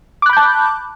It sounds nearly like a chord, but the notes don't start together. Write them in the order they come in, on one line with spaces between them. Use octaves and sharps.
D6 F#6 B5 G6 A5